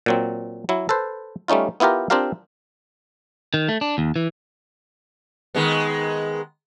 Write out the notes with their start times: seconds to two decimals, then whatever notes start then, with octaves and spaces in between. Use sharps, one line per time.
0.06 A#2 F#3 C4
0.69 F#3 E4
0.89 A4 B4 C5
1.48 G3 A3 C#4 D#4 F4
1.80 B3 E4 F4 G4 A#4
2.10 C4 D4 F4 G4 A#4 F5
3.54 D#3
3.69 A3
3.81 D4
3.98 D#2
4.16 E3
5.55 D#3 G#3 B3